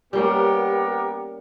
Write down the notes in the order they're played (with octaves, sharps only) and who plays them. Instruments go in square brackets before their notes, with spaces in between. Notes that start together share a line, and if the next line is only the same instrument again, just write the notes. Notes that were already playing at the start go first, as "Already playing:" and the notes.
[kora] G3 A#3 C#4 [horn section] B3 G4 A#4